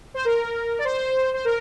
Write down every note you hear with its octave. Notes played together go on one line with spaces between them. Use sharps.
C5
A#4
D5
C5
C5
A#4